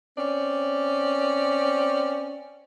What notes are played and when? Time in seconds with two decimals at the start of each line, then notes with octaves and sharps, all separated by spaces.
0.17 C4 C#4 D5